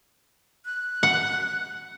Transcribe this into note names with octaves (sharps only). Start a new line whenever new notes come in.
F#6
F#5